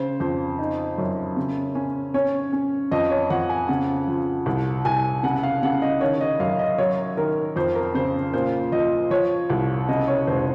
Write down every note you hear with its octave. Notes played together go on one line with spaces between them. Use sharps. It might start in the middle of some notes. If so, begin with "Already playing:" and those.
Already playing: C#3 C5
F2 C5
D#4
F#2
C#3
C#4
C#4 C#5
C#4
F2 D#5
C#5
F2 F#5
G#5
C#3 F#5
F3
C2
C2 G#5
C#3 F#5
F5
C#3 F#5
D#5
D#3 C#5
D#5
F#2 F5
D#5
F#3 C#5
D#3 A#4
F2 C5
A#4
C#3 C5
A#2 C5
F3 D#5
F3 C#5
C2
C#3 D#5
C#5
F1 C5